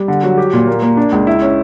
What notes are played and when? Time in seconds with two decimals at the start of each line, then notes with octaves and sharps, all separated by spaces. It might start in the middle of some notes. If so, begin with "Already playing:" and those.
Already playing: G3
0.08 D3
0.23 F#3
0.38 G4
0.53 A#2
0.67 A#3
0.83 A#3
0.97 D4
1.12 C#2
1.27 E4
1.42 C#4